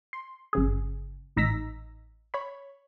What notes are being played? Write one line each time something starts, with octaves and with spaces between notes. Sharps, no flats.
C6
G1 C#3 G#4
A1 D#4 A#5 E6 A#6 B6
C#5 B5